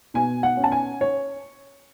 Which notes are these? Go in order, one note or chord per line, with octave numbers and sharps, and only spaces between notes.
B2 G#5
F#5
C#4
A5
G#5
C#5